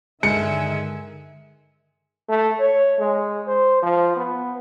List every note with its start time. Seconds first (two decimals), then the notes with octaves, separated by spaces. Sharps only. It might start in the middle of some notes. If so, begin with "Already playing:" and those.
0.23 G2 D3 D#3 G#3 E5 G#5 C#7
2.29 A3
2.60 C#5
3.00 G#3
3.47 C5
3.83 F3
4.17 B3